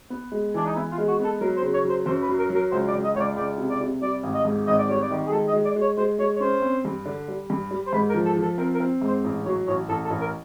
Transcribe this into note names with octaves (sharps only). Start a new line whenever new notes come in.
B3
G#3
E3 D4
D#4
B3 E4
F4
G#3
F#4
B3 A4
F#3 A#4
C5
C#3
C#5
F#3 C5
F#2 C5
B4
F#3
A#4
F#3
A#4
C#2 C5
D5
C#2
D#5
C#2 C#5
D5
C#2 D5
C3
D5
C3
G3 D5
G#1
D#5
G#2
G#1 D#5
D5
G3 C#5
D5
D#3
G#4
G#3 A4
D#5
G#3
D5
G#3
C#5
G#3 C5
G#3 C#5
C#5
C#4 C5
C4
G2
D3
G3
G2
G3
C5
G#2 B4
A#4
F3
A4
F3
A4
C4 A#4
A#4
C4
G#2
C5
A1
F#3 C#5
A1 C#5
A1 A4
A4
A1
A#4